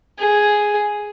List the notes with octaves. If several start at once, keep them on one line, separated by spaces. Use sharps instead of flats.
G#4